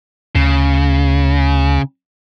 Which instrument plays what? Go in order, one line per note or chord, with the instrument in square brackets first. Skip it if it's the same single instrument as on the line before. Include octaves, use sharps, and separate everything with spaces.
[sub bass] D2 [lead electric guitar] C#3